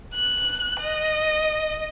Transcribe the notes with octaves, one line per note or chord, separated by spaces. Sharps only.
F#6
D#5